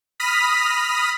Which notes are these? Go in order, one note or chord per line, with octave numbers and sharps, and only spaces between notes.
B5 D#6 F6 A#6 B6